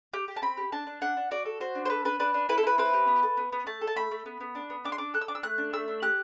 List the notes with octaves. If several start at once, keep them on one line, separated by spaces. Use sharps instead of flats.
G4 G6
G4
A5
C4 B5
G4
D4 A5
D4
D4 F#5
D4
F#4 D5
A4
F#4 C5
D4
C5
A4 B4
D4 B4
D4 B4
D4
E4 B4
A4
E4 B4
C4 B4
G4
B3
A4
B3
B3
A3 A5
A4
A5
A3 B5
A3
B3
B3
D4
B3
D4 D6
C6
D4 D6
A4 F#6
E6
D4 D6
E6
A3 F#6
D4
A3 E6
D4
G4 F#6